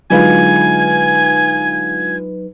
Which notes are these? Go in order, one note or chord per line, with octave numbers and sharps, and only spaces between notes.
D3 F#3 G#3 D#4 F4 B4 G#5 G#6